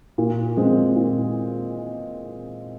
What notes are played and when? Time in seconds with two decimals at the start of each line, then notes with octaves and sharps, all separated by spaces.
0.18 A#2
0.57 G#3 C4
0.96 A#2